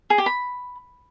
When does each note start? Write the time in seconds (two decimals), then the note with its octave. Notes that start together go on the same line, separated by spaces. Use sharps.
0.10 G#4
0.18 G4
0.26 B5